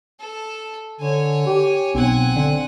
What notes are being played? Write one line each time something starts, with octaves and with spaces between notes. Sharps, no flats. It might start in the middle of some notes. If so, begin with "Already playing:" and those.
A4 A5
D3 C#5 G#5
G4
B1 C4 F#5 G#5 G#6
D3